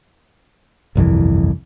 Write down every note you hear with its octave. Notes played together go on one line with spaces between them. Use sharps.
G1 C2 F2 E3